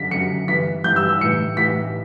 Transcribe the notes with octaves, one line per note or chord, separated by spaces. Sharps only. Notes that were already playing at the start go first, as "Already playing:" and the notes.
Already playing: F#2 D3 B6
F#2 D3 C#7
G2 E3 B6
G2 E3 G6
E6
E6
A2 E3 C#7
A2 E3 B6